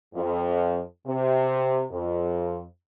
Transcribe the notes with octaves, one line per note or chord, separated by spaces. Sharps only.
F2
C3
F2